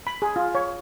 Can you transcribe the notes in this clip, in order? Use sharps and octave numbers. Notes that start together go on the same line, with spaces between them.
B5
G#4
F4
C#5